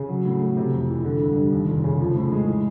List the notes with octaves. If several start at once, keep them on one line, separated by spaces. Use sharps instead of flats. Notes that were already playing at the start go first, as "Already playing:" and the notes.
Already playing: C#3
F#3
A2
A3
C3
F2
E3
D3
G2
G3
D#2
F1
C#3
F3
A2
G#3
E3